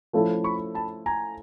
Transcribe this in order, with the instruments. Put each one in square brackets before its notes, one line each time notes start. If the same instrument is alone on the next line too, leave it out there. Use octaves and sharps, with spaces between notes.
[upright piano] F3 A3 C#4 E4 A4
[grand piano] B5 C#6
A5 B5
G#5 A#5